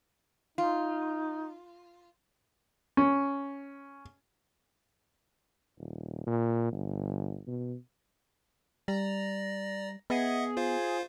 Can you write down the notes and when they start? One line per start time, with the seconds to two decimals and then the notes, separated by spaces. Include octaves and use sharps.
0.58 D#4 F4
2.97 C#4
5.78 D#1
6.27 A#2
6.72 G1
7.47 B2
8.88 G3 D5 A#5
10.10 B3 G#4 D#5 E5 F#5
10.57 F4 C5 F5